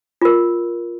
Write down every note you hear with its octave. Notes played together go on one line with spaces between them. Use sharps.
F4 A#4